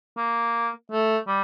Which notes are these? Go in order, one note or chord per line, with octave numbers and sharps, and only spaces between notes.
A#3
A3
G3